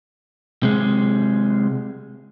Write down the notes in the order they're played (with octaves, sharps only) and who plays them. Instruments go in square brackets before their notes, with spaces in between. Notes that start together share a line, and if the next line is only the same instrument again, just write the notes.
[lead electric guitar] C3 G#3